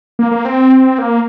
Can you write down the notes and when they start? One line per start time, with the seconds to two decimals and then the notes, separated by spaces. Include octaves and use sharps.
0.19 A#3
0.31 A#3
0.45 C4
0.98 A#3